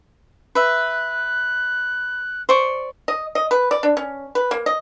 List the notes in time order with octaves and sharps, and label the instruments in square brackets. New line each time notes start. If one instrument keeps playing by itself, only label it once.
[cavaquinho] B4 E5 [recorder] F#6
[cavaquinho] C5 D5 C#6
[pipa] D#5
D#5
B4
D5
D4
C#4
B4
A#3
D#5